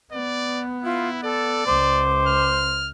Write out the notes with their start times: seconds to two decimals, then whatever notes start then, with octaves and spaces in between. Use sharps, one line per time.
0.12 B3 D5
0.84 E4 F4
1.23 A4 D5
1.67 C#2 C5 D6
2.28 F6